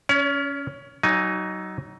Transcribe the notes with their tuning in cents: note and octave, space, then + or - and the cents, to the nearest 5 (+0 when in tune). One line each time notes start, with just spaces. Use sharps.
C#4 +15 C#5 +45
F#3 +30 D#4 +0 G#5 +0